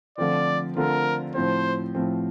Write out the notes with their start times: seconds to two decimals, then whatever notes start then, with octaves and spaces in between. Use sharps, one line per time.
0.18 D3 F3 A3 C4 F4 D5
0.76 D3 F3 A3 C4 F4 A#4
1.35 A2 F3 C4 C5
1.95 A2 F3 C4